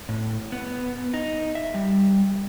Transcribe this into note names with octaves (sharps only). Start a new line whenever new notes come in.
A2
B3
D#4
E5
G3